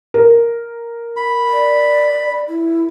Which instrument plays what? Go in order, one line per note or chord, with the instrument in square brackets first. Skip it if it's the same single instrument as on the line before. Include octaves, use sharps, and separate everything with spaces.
[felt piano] A#4
[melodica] B5
[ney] D5
E4